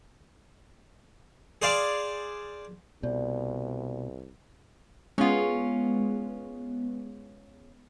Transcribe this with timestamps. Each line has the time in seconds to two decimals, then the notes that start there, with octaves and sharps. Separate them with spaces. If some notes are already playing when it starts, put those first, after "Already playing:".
1.62 G#4 C5 D5 F5
3.03 C2 B2 D5
5.18 G#3 B3 C#4 F4